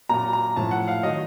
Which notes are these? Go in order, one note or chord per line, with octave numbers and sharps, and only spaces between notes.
A#2 F#3 A#5
A#5
A2 F3 A5
F#5
F5
D#3 F#3 D#5